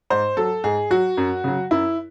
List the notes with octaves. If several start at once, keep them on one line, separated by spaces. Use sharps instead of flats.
G#2 C5
F#3 A4
G#2 G#4
F#3 F#4
F#2
C#3 F#3
F#2 E4